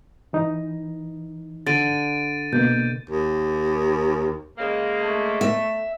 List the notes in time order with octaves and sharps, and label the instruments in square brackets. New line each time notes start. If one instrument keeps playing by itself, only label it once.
[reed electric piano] E3 D#4
[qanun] D3 [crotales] A6 D7 D#7
[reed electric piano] B2 A#3 [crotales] G6
[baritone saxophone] D#2
[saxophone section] C#3 G#3 A#3
[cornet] A3
[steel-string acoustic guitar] E5